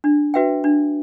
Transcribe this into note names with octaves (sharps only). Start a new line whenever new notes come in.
D4
F#4 B4 E5 G5
D4